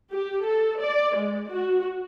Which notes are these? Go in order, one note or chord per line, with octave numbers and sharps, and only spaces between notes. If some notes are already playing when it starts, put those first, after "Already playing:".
G4
A4
D5
G#3
F#4